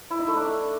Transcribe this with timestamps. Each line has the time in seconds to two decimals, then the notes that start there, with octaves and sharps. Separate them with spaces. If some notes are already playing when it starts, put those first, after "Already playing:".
0.10 E4
0.19 D#4
0.28 A3
0.37 D4